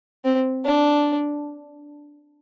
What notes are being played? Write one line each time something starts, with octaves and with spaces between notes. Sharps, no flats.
C4
D4